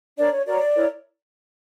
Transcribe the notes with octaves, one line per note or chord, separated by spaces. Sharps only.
D4 A#4 C#5 D5
C#5
F#4 A#4 C#5 D5
E4 A#4 C#5